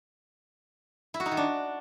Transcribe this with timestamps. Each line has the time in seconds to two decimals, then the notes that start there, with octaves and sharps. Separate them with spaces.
1.14 E4
1.20 F#4
1.26 D#4
1.31 D#3
1.37 D4